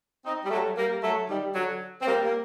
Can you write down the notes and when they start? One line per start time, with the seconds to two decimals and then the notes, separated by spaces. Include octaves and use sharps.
0.25 C4 D#4
0.45 G3
0.50 F#3 A3
0.77 G3 A#3
1.02 F#3 A3
1.29 D#3 G3
1.55 D3 F#3
2.01 C4
2.07 G3 A#3
2.25 A#3